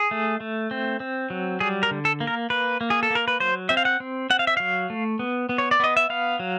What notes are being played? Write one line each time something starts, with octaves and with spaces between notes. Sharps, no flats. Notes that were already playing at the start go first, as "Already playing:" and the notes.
Already playing: G#4
A3
A3
C4
C4
F#3
G3 G#4
A#4
D3
A4
A#3
A#4
A#3 B4
A#3
G#4
A4
A#3 A#4
B4
F#3 C5
C4 E5
F5
F#5
C4
C4 F#5
F5
E5
F#3 F5
A3
B3
B3
C#5
D5
B3 D#5
E5
B3 F5
F#3